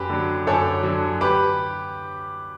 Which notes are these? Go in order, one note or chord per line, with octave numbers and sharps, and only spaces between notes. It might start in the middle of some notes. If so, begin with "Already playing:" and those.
Already playing: F#2 G4 B4
D3 F#3
F#2 A4 C#5
D3 F#3
G4 B4